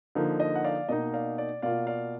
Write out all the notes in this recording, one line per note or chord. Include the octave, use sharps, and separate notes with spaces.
D3 F3 A#3 D#4
D#5
F#5
D5 F5
B2 A#3 D#4 D#5
D5 F5
D5
B2 A#3 F4 D5 F5
D5 F5